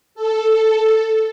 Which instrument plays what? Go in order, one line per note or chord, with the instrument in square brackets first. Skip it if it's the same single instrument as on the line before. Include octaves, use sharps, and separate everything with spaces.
[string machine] A4